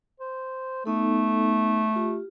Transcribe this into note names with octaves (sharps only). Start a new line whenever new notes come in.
C5
A3 B3 D#4 A4
F4 G4